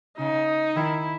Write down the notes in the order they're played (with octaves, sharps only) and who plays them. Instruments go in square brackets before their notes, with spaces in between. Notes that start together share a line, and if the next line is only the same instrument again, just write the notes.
[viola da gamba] C#3 [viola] D#4
[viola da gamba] D#3 [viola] E4